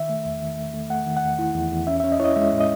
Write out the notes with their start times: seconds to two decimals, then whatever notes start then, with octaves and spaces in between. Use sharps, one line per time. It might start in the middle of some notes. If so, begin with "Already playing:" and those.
Already playing: D#3 E5
0.09 A3
0.25 E2
0.42 D#3
0.58 A3
0.74 A3
0.90 A3 F#5
1.06 D#3
1.17 F#5
1.23 E2
1.39 E4
1.55 E2
1.71 E2
1.87 C#4 E5
2.00 E5
2.04 C#4
2.12 D#5
2.19 E4 C#5
2.24 D#5
2.35 G#3 E5
2.52 A2
2.60 D#5